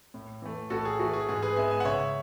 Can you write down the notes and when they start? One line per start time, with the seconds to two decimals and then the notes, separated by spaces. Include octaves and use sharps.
0.14 A2
0.42 E3 A3
0.70 A2 F#4 A4
0.85 G#4
0.99 E3 A3 F#4
1.13 G#4
1.29 G#2 G#4
1.42 G#4 B4
1.56 G#3 B3 E5 G#5
1.71 E5 G#5
1.80 F#5
1.85 C#3 C#5 E5